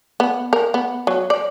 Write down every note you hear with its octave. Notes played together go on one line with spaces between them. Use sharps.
B3
A#4
B3
F#3
D5